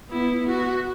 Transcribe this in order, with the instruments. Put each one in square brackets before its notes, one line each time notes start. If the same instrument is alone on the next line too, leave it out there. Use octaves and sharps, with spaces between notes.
[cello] B3 [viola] E4
[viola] F#4